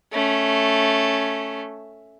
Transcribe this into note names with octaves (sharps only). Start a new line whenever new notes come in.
A3 C#4